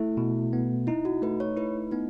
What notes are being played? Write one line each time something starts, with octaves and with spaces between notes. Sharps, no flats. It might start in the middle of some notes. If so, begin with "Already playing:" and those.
Already playing: A3 E4
B2
B3
D#4 E4
F#4
A3 B4
C#5
E4 B4
B3 D#4